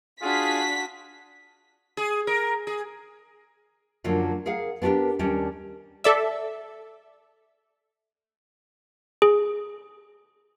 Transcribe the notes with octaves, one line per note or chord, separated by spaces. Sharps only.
D4 F4 F#4 G#4 B6
G#4
A#4
G#4
F#2 D3 F3 F#3 A#3
G#4 A#4 F5 F#5
B3 D4 F#4 G4 A#4
D#2 G3 C#4 D4
A4 D5 E5
G#4